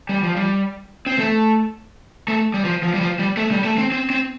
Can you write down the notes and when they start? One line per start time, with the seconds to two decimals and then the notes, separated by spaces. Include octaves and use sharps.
0.09 G3
0.23 F3
0.36 G3
1.06 C4
1.19 A3
2.28 A3
2.54 G3
2.65 F3
2.83 F3
2.94 G3
3.01 F3
3.19 G3
3.37 A3
3.51 G3
3.65 A3
3.78 C4
3.92 C4
4.10 C4